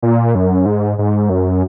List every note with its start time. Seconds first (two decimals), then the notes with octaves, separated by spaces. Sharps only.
0.02 A#2
0.35 F#2
0.66 G#2
0.98 G#2
1.29 F#2